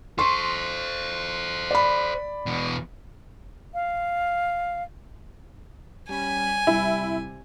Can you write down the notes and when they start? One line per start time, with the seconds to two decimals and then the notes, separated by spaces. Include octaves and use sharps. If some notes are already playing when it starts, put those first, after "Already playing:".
0.18 A4 C5 C6 C#6
1.71 D5 B5
2.46 E2 B2
3.74 F5
6.09 G3 C#4 G#5 B5
6.67 C3 G3 E4